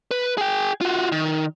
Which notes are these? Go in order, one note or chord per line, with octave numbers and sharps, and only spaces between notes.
B4
G#4 G5
F4 F#4
D#3